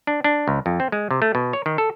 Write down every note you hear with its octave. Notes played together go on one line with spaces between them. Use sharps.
D4
D4
C#2
F2
C4
G#3
C3
A3
B2
C#5
D#3
A4